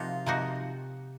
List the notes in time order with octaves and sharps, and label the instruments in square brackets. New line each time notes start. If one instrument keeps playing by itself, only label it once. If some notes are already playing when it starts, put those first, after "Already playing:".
Already playing: [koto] C3 F3 A#3 D#4 F#4 [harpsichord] F4
[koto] C3 F3 A#3 D#4 F#4